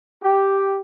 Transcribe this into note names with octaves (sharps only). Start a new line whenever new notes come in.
G4